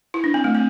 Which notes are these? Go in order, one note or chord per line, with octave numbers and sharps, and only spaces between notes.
E4
D4
C4
A3
C4